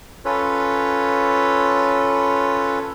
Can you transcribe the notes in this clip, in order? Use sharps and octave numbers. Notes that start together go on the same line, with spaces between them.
C#4 F4 A4 B4 C#5